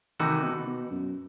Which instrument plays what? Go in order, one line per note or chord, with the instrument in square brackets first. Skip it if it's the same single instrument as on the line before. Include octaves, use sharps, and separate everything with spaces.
[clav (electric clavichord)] C3 E3 A3 D#4 F#4 [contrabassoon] D#3
[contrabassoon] B2
B2
F#2